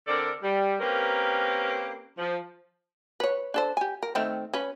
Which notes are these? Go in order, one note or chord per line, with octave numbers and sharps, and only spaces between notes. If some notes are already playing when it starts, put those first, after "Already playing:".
D3 C4 A4 A#4 D5
G3
A#3 C4 C#4 G4 A#4 B4
F3
B4 C#5
D4 A4 C5
G4 G#5
A#4
D#3 A3 C4
C#4 B4